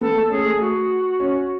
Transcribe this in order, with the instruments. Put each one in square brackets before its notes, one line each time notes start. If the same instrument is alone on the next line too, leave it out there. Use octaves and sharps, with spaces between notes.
[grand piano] B3 [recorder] A4
[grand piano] A3
[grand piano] C#4 [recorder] G#4
[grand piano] A3
[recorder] F#4
[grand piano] C#4